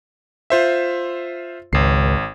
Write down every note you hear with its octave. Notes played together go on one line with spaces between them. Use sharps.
F4 C5 E5
G#1 C#2 C7